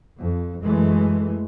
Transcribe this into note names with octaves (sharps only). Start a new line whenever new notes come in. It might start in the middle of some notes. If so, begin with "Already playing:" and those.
F2
F#2 E3 G#3 A3